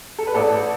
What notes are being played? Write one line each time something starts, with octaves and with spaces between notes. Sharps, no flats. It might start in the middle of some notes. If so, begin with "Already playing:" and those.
A4
B4
A1 A4 D5